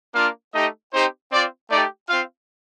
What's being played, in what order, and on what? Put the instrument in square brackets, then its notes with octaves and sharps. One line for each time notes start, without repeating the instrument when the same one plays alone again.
[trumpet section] A#3 D4 F4 F5
A3 D#4 G4 D#5
C4 D#4 G4 C5
C4 F4 D5
A3 D#4 G4 D5
C4 F4 F5